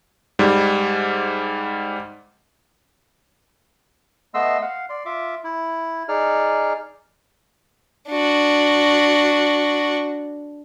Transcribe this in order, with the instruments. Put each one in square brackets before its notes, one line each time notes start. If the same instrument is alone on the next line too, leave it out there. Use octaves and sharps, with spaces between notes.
[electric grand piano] G#2 G3
[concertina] A3 B3 D#5 C6 E6
F5 F#5
D5 C6
F4 E5 D6
E4
D#4 G#4 D5 F6
[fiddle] D4 F#4